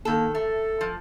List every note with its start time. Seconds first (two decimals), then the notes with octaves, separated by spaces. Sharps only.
0.05 D#3 A#3 A4
0.35 A3 A4
0.81 F3